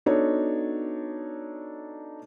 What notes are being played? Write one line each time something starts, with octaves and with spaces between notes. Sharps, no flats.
B3 D4 D#4 F#4 A4 C#5